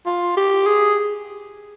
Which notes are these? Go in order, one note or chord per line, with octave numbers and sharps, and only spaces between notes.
F4
G4
G#4